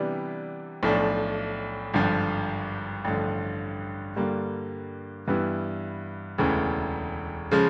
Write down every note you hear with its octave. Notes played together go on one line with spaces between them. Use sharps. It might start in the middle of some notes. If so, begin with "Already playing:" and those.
Already playing: C3 E3 G3 B3 D4
B1 A2 F3 A3 D4
G#1 G2 D3 F3
A1 G2 D3 F3
G2 D3 G3 A#3
G2 E3 G3 B3 E4
E1 D2 C#3 E3
C#3 F3 G#3